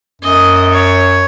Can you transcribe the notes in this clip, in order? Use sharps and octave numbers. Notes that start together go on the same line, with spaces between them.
F#2 D#5
C#5